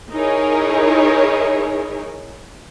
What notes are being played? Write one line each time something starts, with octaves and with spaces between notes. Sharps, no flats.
D#4 E4 G#4 A#4 C#5